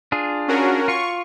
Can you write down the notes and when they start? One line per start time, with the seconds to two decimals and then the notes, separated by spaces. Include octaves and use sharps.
0.12 D4 F4 G#4
0.48 C#4 F#4 A#4
0.88 F4 C#6